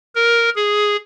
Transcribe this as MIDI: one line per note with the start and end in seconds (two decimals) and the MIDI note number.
0.15 0.49 70
0.56 0.96 68